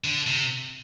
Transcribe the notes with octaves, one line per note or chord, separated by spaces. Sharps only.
D3
C3